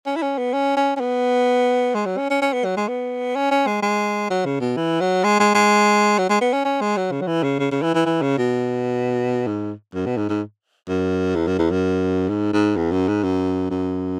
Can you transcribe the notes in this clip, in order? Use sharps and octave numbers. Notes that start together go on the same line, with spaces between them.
C#4
E4
C#4
B3
C#4
C#4
C#4
B3
G#3
F#3
C#4
C#4
C#4
B3
F#3
G#3
B3
C#4
C#4
G#3
G#3
F#3
C#3
B2
E3
F#3
G#3
G#3
G#3
F#3
G#3
B3
C#4
C#4
G#3
F#3
C#3
F#3
E3
C#3
C#3
C#3
E3
E3
E3
C#3
B2
G#2
F#2
B2
G#2
G#2
F#2
E2
F#2
E2
F#2
G#2
G#2
E2
F#2
G#2
F#2
F#2